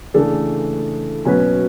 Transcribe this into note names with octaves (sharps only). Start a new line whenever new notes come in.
C#3 E3 A3 D4 A4
B2 F#3 C#4 F#4 B4